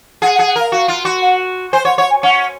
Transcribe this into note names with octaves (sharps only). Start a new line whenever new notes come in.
G#4 F#5
F#5
G#4
F#5
A#4 F5
F#4 F5
F4
F#4
F#5
C5 G#5
C#5 F#5
C#5 F#5
G#5
C#4 F#5